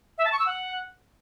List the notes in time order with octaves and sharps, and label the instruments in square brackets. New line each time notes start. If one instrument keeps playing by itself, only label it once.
[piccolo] E5
A5
C#6
E6
F#5